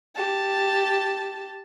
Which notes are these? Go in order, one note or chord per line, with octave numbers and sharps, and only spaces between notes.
G4 A5